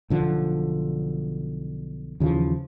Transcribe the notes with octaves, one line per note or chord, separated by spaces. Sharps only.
B1 D3 F3
D#2 C#3 E3 F3